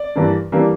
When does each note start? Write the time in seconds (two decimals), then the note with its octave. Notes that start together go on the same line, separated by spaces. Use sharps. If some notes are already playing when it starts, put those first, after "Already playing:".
Already playing: D5
0.16 G2 E3 A#3 D4
0.52 E3 G3 A#3 D4